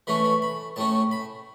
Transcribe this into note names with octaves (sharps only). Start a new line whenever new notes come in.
E3 A3 C#4 B5
B5
B5
A2 A3 C#4 A5
B5